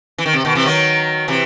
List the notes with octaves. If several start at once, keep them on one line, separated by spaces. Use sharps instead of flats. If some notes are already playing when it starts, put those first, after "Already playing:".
E3
D#3
C3
B2 D#3
C3 E3
D#3 F#3
C3 E3